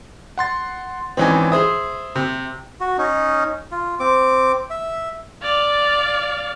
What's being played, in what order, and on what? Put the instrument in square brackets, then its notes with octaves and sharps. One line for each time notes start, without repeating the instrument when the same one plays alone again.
[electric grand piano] F#5 C6 A6
[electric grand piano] G#1 E3 G#5 [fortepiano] C4 C#4 D#4
[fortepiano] G#4 C5 D#6 [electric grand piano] E5
[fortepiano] C3
[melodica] F#4
C#4 D#4
F4
C4 D6
E5
[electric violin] D5 F5